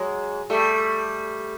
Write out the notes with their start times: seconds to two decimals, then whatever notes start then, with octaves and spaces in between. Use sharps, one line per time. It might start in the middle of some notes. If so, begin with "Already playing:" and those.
Already playing: F#3 G#3
0.50 G3 A3